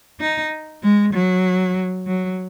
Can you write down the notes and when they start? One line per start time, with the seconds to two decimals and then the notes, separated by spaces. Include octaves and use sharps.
0.20 D#4
0.83 G#3
1.13 F#3
2.07 F#3